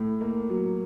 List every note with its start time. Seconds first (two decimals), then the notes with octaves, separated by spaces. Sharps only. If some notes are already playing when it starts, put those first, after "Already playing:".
Already playing: A2
0.21 A#3
0.50 F#3